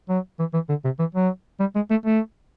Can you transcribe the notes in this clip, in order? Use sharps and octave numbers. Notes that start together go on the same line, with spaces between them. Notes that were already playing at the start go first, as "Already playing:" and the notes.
F#3
E3
E3
D3
C3
E3
F#3
G3
G#3
A3
A3